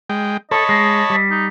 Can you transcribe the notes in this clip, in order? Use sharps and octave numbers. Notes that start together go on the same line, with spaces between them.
G#3 G5
A4 C#5 D#5 A5 B5
G#3
G3
D#4